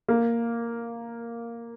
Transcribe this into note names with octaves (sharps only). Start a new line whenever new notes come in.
A#3